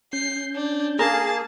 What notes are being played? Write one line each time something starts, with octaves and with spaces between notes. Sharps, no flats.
C#4 G6 C7
D4
A#3 G#4 A#4 A5